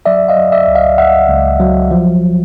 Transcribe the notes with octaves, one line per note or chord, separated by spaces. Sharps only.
F#3 D5 E5
D#5 F5
F#3
D5 E5
C#2
D#5 F5
C#2 E5 F#5
C#2
F#3
F3